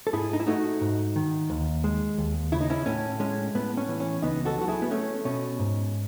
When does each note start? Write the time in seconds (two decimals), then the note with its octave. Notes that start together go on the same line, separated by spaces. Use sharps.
0.07 A4
0.13 G#2 E4 G#4
0.33 D#4
0.40 E4
0.47 A3 D#4 F#4
0.81 G#2
1.16 D#3
1.50 D#2
1.84 G#3
2.18 D#2
2.52 C#3 E4
2.61 D#4
2.70 C#4 E4
2.86 A2 C#4
3.20 G#3 C#4
3.55 A2 B3
3.77 C#4
3.89 E3
4.00 C#4
4.22 C#2 B3 D#4
4.45 F#4 A4
4.58 F#3 F#4
4.68 E4 G#4
4.82 B3
4.91 A3 C#4
5.25 B2 C#4
5.59 G#2